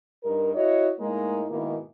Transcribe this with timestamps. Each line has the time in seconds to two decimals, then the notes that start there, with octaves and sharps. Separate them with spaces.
0.23 G2 D#4 A#4
0.55 E4 F#4 C#5 D#5
1.00 A2 G#3 A#3 D#4
1.49 G#2 B2 D#3 A#3 E4